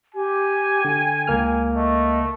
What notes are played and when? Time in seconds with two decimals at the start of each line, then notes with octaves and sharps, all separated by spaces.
0.15 G4 G#5
0.85 D3 G5
1.27 C#2 A#3 F6
1.75 A3 D#5